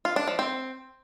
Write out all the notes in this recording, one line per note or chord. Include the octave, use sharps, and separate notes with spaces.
F4
D4
F3
C4